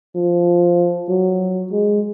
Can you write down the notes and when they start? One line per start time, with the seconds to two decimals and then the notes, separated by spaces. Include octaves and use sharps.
0.16 F3
1.09 F#3
1.72 G#3